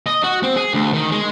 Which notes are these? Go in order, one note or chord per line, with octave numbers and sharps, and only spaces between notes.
D#5
F#4
C4
G#4
D2
D#3
G#3